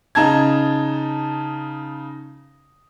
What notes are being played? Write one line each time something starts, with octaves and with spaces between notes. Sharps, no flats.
C#3 D#4 A5 A#5 G#6